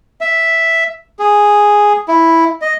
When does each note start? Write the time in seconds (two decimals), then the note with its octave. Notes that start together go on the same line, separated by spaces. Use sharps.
0.21 E5
1.19 G#4
2.08 E4
2.62 D#5